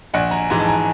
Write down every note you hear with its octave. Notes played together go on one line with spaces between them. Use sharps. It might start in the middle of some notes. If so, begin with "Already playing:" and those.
A#1 F#5 G#5
G#5 A#5
G#2 E3 G#5 A#5
A5
G#5 A#5